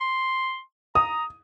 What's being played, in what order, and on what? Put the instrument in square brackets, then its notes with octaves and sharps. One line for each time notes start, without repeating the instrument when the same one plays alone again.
[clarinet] C6
[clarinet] A#5 [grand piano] D#6